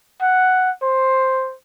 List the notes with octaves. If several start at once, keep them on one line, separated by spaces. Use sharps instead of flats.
F#5
C5